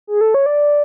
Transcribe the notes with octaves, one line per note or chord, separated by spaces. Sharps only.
G#4
A4
C#5
D5